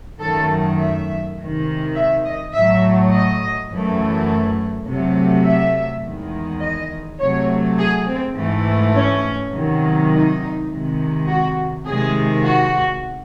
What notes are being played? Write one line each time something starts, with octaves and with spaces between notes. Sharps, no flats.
F#2 D#3 A3 A4
E5
C3 D#3 G#3
E5
D#5
A2 F#3 A3 E5
D#5
F#2 E3 A3
C3 F#3 A3
E5
E2 D#3 G#3
D#5
C3 F#3 A3 C#5
G#4
C4
G#2 E3 A3
C#4
C3 D#3 F#3
D#4
C3 D#3 G#3
F#4
C3 D#3 G#3 G#4
F#4